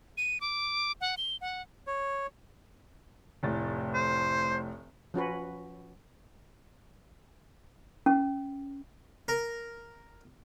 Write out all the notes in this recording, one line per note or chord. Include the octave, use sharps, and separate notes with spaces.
D#7
D6
F#5
G7
F#5
C#5
F1 A2 A6
C5
F3 C#4 F#4 B4
C#4
A#4